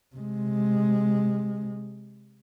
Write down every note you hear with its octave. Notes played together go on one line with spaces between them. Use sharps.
C3 G#3